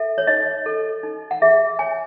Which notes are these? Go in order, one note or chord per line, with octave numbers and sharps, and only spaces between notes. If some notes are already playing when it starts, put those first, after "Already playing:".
Already playing: A4 E5
C#5
D#4 D#5
A4
D#4
F#5
G#4 E5
C#5 G#5